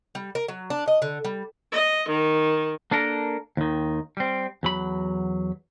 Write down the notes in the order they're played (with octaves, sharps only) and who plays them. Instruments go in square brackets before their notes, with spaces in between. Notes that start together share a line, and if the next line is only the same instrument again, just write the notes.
[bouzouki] G3
A#4
F#3
D4
D#5
D3
G3
[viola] D#5
D#3
[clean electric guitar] A#3 D4 A4 A#4
D#2 D#3
G3 C4
E2 F#3 B5